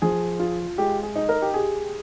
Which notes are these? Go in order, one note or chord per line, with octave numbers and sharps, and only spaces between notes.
F3 G#4
F4
G#3 G4
G#4
D#4
A#4
G4
G4 G#4